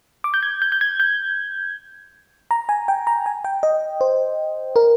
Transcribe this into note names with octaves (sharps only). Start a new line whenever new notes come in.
D6
G6
G#6
G6
G6
G#6
G6
A#5
G#5
G5
A#5
G#5
G5
D#5
C5
A#4